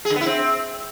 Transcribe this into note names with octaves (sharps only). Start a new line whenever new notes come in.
G#4
D3
B3
E4
C4